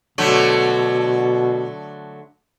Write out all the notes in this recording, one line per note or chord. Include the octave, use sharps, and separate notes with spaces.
B2 D3 F#3 A3